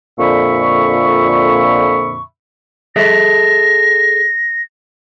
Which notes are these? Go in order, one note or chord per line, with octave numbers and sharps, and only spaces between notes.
F2 A#2 D3 E5 B5 C#6
G#4 A4 E5 A#6